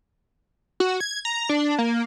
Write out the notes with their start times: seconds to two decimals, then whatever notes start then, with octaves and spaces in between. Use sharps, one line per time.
0.80 F#4
1.00 G#6
1.25 A#5
1.49 D4
1.78 A#3